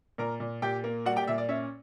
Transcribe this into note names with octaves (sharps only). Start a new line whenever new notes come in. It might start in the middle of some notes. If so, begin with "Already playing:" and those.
A#2 A#4 A#5
A#2
A#2 G4 G5
A#3
G3 F#4 F#5
G4 G5
D5
A#2 E5
D5
C#4 E5